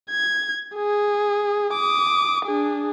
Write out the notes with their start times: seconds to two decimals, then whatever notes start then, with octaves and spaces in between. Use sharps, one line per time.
0.11 G#6
0.76 G#4
1.74 D6 D#6
2.46 D4 G#4